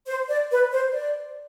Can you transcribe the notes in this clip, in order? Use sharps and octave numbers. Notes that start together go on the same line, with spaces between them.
C5
D5
B4
C5
D5